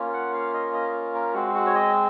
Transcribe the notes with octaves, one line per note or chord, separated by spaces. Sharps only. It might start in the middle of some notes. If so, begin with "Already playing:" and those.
Already playing: A#3 C#4 F4
F#5
F5
D#5
D#5
A#4
G#3 C4 F#4
F#4
C#5
D#5